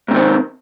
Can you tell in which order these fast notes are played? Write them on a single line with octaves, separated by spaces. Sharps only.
G#2 C3 D#3 C4